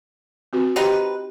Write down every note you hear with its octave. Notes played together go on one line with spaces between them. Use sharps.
C4 F#4 B4
C4 D#4 G4 B4 G5